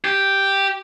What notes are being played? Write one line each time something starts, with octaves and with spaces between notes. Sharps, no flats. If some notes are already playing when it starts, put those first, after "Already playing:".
G4